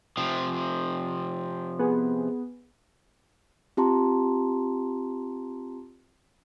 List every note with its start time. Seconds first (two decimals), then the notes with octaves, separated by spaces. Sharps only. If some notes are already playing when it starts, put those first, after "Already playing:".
0.17 C3 F3
1.79 B3 G#4
3.77 C4 F4 G4 A5 A#5 C6